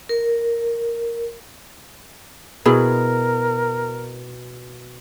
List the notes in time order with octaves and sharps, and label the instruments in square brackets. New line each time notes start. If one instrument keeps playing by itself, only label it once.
[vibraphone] A#4
[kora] B2 [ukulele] E4 G#4 [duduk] A#4